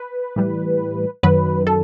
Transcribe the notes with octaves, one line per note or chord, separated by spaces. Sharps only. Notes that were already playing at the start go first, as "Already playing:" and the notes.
Already playing: B4
A2 E3 G3
F#2 D#3 F#3 B4
A4